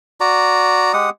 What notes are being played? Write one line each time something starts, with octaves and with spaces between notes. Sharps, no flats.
F#4 D5 A#5
G#3 G4 F#5 D#6